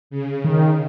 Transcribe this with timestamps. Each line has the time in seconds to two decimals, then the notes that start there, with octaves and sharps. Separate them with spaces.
0.10 C#3
0.44 D#3